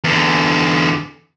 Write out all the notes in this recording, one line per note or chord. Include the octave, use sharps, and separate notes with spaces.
E2 D3